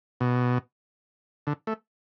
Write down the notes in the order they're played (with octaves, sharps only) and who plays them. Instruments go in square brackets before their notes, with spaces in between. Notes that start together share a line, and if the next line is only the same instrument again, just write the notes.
[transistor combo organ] B2
D3
A3